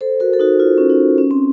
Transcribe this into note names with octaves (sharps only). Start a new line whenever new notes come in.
A4 C5
F#4 A#4
A4
D#4 F#4
F4
C#4
D#4
C#4
C4